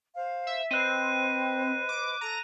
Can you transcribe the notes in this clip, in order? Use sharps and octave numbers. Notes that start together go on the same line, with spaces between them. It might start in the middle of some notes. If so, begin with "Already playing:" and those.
C5 F5
E5
C4 B4 C5 D#5 F#6 D#7
D6
A4 A#5 A#6